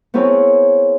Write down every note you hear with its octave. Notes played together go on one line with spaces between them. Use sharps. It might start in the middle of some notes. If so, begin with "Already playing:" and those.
B3 C4 E4 G#4 A#4 C#5